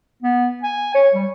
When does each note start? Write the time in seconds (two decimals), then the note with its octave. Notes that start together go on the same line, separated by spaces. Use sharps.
0.23 B3
0.63 G#5
0.94 C#5
1.14 G3